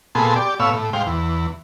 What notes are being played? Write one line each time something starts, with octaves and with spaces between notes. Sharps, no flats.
A#2 B3 G#4 A4 C6
G4 D5
A2 B3 C#5 F5 E6
A2
G#2 C5 F5 G5
E2